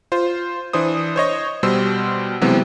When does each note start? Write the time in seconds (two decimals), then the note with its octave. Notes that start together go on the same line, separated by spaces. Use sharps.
0.12 F4 C5
0.73 E3 D4 C5 D#6
1.16 C5 C#5 D#5 C#6
1.63 B2 G3 C5 C6 E6
2.41 C3 E3 F#3 G#3 B3 C4